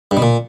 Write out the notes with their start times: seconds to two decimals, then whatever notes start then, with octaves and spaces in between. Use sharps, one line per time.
0.11 G2
0.17 B2
0.22 A#2